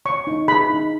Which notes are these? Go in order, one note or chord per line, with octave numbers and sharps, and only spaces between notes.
C#5 C#6
D#4
G#4 B5
D#4